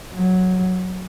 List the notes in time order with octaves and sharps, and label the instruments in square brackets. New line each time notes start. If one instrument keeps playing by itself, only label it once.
[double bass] F#3